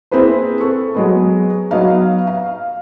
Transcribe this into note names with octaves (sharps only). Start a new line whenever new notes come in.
A#3 C4 E4 G#4 B4 C5
A4 C#6
F#3 G#3 B3
F#3 B3 D#4 F5
F5